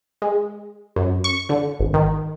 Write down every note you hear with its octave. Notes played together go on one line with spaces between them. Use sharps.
G#3
F#2
C#6
D3
G#1
D#3